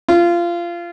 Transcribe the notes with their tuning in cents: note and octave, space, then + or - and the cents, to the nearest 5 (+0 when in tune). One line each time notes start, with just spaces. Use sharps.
F4 -20